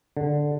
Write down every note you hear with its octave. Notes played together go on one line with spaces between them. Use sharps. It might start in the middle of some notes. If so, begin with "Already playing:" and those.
D3